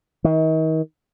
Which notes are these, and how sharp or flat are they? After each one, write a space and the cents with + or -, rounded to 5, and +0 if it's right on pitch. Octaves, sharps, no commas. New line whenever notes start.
D#3 +35